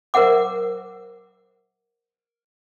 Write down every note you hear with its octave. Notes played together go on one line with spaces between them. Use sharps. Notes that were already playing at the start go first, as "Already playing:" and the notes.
A#4 C5 E5 F#5 D6